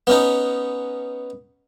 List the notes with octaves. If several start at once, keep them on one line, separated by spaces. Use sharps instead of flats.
B3 C#4 D#4